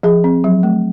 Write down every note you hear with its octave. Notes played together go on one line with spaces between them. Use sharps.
F3 G#4
C4
F#3
A3